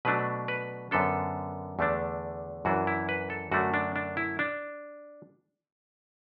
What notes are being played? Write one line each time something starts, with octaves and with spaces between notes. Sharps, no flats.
B2 F#3 A3 D4 B4
B4
F#2 D3 B3 D4 A4
E2 D3 A3 D4
F#2 E3 D4 F#4
E4
B4
A4
F#2 D3 A3 D4 F#4
D4
D4
E4
D4